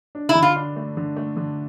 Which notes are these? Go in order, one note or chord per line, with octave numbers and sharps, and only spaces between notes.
D4
E4
D3
F4
D4
A3
D3
A3
D3